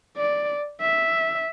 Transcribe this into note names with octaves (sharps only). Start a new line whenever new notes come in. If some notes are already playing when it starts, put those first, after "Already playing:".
D5
E5